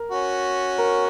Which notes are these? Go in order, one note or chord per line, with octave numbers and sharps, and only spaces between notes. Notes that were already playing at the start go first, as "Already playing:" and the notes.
Already playing: A#4
C#4 F#4
A#4